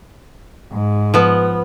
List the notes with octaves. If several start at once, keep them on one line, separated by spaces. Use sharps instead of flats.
G#2
F3 B3